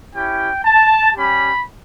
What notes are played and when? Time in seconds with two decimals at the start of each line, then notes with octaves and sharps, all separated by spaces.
0.13 C#4 E4 G4 G5
0.64 A5
1.15 G3 C#4 G4 B5